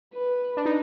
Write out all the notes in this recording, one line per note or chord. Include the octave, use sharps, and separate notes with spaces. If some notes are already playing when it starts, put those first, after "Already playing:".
B4
D4
D#4